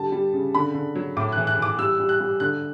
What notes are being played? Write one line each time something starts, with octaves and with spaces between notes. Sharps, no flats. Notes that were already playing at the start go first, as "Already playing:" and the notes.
Already playing: D3 G3 A5
G3
C#3
D3 B5
D3
F#3
A2 D6
E3 F#6
F#6
E3 D6
G3 E6
G3
F#6
G3
D3 F#6